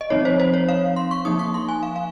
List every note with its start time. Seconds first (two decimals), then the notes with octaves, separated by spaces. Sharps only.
0.01 D#5
0.10 F3 C4 D#4 C#5
0.25 C5
0.40 C5
0.54 C#5
0.69 F5
0.96 C6
1.11 C#6
1.25 F3 A#3 D#4 D#6
1.39 C#6
1.54 C6
1.68 G#5
1.83 F5
1.96 F5